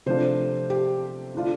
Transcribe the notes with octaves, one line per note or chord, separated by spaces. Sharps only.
C3 F3 A3 D4 F4 C5
G4
D3 A3 D4 F4